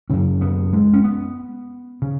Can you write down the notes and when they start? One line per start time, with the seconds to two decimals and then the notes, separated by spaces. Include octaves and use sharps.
0.10 F#2 C#3 C#4
0.41 B3
0.73 G#3
0.93 C#4
1.04 B3
2.02 C#3